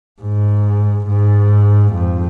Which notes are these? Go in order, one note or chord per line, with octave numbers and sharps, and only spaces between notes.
G#2
G#2
F2